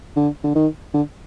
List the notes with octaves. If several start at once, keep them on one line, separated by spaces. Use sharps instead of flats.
D3
D3
D#3
D3